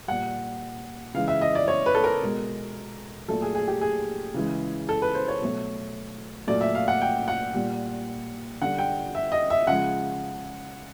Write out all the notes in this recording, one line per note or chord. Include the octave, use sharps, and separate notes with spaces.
A#2 G3 F#5
C#3 E3 G#3 F5
E5
D#5
D5
C#5
B4
A4
A#4
B2 G#3
A#2 F#3 A3 A4
G#4
G#4
G4
G#4
C#3 E3 G#3
A4
B4
C5
C#5
B2 F#3 A3
A#2 F#3 A3 D5
E5
F5
F#5
G5
F#5
A#2 G3
D3 G3 F#5
G5
E5
D#5
E5
C#3 F3 G#3 F#5